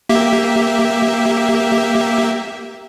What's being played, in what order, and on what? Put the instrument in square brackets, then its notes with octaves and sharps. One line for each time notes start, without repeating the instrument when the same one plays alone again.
[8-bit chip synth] A#3 G4 E5